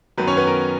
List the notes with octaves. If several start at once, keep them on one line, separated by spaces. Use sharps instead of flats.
F#2 D#3 F#3 B3 B4
C#4 C#5
B3 B4
A#4